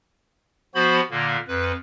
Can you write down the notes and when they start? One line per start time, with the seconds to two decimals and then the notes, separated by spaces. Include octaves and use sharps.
0.75 F3 B3 F#4 C5 B5
1.10 A#2 D3 A#3
1.47 F2 B4